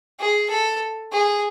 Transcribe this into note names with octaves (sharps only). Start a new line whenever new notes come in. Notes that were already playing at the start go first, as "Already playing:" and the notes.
G#4
A4
G#4